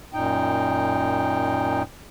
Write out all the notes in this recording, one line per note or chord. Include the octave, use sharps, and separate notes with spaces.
F#2 A#2 D#4 G5